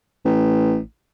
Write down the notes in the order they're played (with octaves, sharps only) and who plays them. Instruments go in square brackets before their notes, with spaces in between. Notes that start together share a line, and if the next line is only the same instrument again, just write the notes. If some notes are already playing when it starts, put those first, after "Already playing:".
[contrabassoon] A1